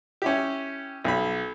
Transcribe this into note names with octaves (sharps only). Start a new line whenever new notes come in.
C#4 E4 G4
B1 B5